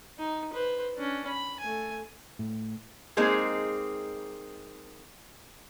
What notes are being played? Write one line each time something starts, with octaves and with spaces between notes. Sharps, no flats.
D#4
B4 C5
C#4 D4
B5
A3 G#5
A2
G#3 A#3 C4 D#4 G#4